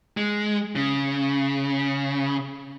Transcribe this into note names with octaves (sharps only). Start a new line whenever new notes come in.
G#3
C#3